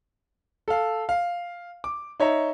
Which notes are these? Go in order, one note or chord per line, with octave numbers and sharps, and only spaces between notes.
A4 F5
F5
D6
D#4 C#5 E5 A#5